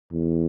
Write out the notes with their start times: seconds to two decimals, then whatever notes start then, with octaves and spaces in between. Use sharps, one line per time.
0.12 E2